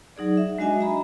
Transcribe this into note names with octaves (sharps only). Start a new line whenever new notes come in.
F#3 D#4 G#4 D5
E5
G#3 D4 F#4 D#5 E5 G#5
E5 A#5 B5